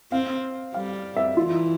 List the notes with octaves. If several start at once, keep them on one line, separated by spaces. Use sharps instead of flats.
C4 F5
G3 F5
E5
E3 F4